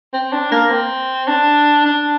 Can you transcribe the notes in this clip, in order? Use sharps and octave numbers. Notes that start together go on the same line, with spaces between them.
C4
D4
A#3
C4
D4
D4